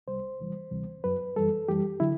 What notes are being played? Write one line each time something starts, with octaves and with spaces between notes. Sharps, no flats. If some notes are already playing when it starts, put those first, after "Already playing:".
C2 C3 G3 C5
E2 C3 E3 G3
D2 C3 E3 G3
F#2 F#3 B4
F#2 E3 G3 A4
F#2 E3 G3 G4
D3 F#3 E4